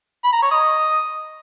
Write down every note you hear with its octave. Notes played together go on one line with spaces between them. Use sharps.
B5
A#5
C#5
D#5